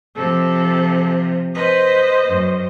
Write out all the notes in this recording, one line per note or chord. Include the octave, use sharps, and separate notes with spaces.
C3 F3 A4
B4 C5 D#5
F#2